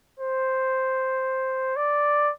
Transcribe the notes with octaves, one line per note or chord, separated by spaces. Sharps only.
C5
D5